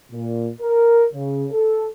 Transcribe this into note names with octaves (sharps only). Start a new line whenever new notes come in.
A#2
A#4
C#3
A4